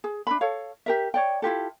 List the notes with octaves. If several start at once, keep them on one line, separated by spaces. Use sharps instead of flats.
G#4
D4 E5 B5
A4 C#5 F5
G4 A#4 E5
C#5 D5 G5
E4 F4 G4 A4